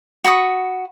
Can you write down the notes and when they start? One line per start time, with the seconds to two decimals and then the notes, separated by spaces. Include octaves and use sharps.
0.24 F#4 B5 C#6 D#6